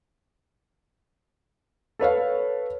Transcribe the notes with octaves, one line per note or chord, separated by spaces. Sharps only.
A4 B4 C#5 F5